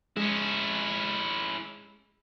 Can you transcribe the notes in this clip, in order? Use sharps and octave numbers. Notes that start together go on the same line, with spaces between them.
G#3 C#4 E4